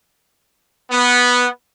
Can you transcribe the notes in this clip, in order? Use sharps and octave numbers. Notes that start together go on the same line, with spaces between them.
B3